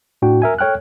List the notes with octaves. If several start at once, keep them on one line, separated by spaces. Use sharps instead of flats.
A2 D4 F#4 G5
A#4 E5 G#5
A4 C#5 G5 F6 F#6